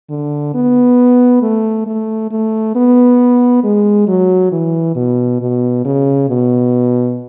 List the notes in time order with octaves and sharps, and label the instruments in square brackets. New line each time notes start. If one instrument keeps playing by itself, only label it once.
[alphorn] D3
B3
A3
A3
A3
B3
G#3
F#3
E3
B2
B2
C#3
B2